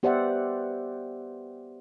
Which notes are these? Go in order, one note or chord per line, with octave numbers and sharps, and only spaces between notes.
B3 G4 C5 D5 E5 F#5